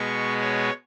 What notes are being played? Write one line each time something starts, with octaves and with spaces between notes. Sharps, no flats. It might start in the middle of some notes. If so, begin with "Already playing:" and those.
Already playing: B2 G#3 B3 C#6
C#5